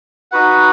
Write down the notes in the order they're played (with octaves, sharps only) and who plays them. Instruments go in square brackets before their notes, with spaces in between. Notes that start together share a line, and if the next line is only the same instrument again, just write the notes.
[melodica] D#4 F#4 B4 F#5